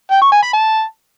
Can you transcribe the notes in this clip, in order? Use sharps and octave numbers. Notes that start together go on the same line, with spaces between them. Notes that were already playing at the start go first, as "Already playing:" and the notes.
G5
C#6
G#5
B5
A5